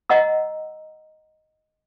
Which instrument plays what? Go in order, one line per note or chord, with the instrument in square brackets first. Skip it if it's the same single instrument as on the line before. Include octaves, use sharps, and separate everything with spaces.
[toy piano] D#5 F#5 A#5 E6